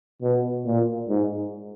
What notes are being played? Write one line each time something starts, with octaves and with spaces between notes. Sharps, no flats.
B2
A#2
G#2